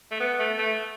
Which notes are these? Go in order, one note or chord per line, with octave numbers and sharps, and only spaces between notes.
A3
B3
A3
A3